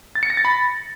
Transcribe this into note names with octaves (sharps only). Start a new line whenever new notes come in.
A6
C#7
A#6
A6
B5